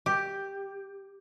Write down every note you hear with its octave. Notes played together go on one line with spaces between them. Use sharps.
G4